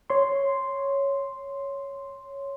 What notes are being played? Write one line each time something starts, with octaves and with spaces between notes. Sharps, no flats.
C#5 C6